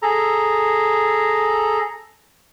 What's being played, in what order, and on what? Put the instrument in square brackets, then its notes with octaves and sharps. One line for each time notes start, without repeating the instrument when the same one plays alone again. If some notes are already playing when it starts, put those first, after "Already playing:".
[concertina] G#4 A4 A#5